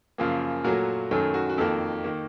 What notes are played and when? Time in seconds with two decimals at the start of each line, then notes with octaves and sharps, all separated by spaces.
0.18 F#2 C#3 F3 A#3
0.64 A#2 F#3 A3 F#4 A#4
1.11 F#2 D#3 F#3 A3 A4
1.34 F#4
1.50 F#4
1.58 F2 D#3 A#3 A4
2.04 D#3 A#3